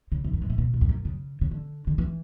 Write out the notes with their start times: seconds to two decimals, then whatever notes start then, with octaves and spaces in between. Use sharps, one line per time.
0.12 C#3
0.24 E2
0.33 F#2
0.42 G2
0.50 A#2
0.58 B2
0.74 A#2
0.81 E2
0.89 F#2
1.05 C#3
1.41 C#3
1.51 D3
1.87 D3
1.98 E3